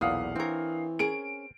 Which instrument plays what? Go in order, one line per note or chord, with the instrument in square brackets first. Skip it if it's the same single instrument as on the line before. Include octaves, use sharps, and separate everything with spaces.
[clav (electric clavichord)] B1 E2 A#2 [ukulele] E4 [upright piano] F5 F#5 D#6
[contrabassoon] E3 [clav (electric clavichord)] C4 C#5 [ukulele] D4 A#4
[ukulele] C#4 G#4 A#4 [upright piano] D7